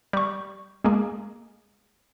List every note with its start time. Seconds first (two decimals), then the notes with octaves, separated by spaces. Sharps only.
0.13 G3 C#6
0.84 G#3 A#3 G#4